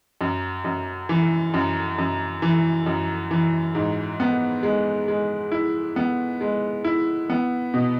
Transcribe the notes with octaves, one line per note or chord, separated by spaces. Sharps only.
F#2
F#2
E3
F#2
F#2
E3
F#2
E3
G#2
B3
G#3
G#3
E4
B3
G#3
E4
B3
B2